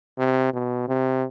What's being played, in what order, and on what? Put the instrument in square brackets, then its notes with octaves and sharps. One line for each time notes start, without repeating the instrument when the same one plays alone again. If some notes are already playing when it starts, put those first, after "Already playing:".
[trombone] C3
B2
C3